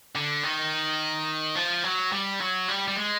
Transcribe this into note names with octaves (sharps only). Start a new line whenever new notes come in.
D3
D#3
F3
F#3
G3
F#3
G3
G3
G#3